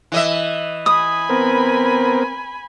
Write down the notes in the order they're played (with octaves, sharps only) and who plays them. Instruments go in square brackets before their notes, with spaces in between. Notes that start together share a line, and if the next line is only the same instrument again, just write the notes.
[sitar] E3 D#5 E5
[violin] G#5 B5 [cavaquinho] D#6
[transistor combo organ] B3 C4 A#4